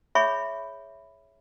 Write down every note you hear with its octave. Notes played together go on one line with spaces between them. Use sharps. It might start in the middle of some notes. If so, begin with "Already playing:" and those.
G#4 C#5 E5 B5 C#6